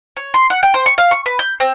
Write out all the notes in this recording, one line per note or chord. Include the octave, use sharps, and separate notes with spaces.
C#5
C6
F#5
G5
C5
C#6
F5
C#6
B4
G6
C4